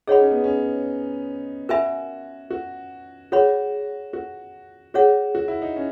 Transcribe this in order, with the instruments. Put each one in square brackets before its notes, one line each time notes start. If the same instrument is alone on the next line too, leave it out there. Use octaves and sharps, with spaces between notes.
[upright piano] D#4 [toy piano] G#4 C#5 F#5 B5
[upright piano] C#4
B3
C#4
[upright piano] F#4 [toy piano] A#4 E5 G#5 B5
[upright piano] F#4
[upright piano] F#4 [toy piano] G#4 C#5 F#5 B5
[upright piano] F#4
[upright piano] F#4 [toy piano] G#4 C#5 F#5
[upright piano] F#4
E4
D#4
C#4